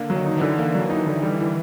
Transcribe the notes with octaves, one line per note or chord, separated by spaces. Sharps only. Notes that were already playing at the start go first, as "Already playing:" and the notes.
Already playing: D3 A#3
F#3
D#3
D#4
D#3
D3 E3
E3 A#3
F#3
D3
D#3 D#4
D3
G3
E3